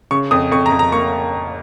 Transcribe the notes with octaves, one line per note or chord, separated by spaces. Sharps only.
C#3 C#6
F2 D#6
F2 C#6
A#5
F2
A#5
A#3 C#6